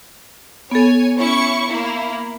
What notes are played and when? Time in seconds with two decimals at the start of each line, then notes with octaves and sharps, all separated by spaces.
0.71 B3 A4 C#5 G#5
1.19 C#4 E4 C#6
1.67 A#3 E4